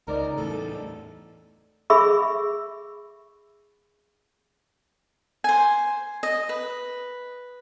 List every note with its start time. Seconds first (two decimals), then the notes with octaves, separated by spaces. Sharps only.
0.08 C#2 D#4 A#4 D5
0.38 E2 A2 A4
1.90 G#4 E5 B5 C#6 E6
5.44 C5 G#5
6.23 D#5
6.49 B4